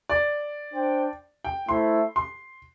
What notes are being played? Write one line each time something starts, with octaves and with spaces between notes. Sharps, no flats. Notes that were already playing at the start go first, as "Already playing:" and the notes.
D5
D4 C5 G5
G5
A3 E4 C5 E5 C6
C6